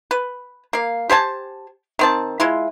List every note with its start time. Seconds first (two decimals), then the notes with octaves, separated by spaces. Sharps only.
0.11 B4
0.73 A#3 F5
1.10 G4 C5 G#5 A5
1.99 D#3 C4 A5
2.40 G#3 E4 F4